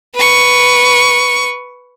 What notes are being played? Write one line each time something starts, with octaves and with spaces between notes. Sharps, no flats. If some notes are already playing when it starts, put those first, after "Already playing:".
B4 C#6